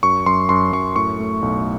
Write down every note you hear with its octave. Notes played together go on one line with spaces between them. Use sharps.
F#2 C#6
F#2 C6
F#2 C6
F#2 C#6
A2 C#6
A3
B1